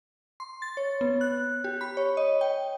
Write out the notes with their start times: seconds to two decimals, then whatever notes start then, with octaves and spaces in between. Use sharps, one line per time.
0.40 C6
0.62 A6
0.77 C#5
1.01 B3
1.21 F#6
1.64 G4
1.81 B5
1.97 C#5
2.17 D#5
2.41 G5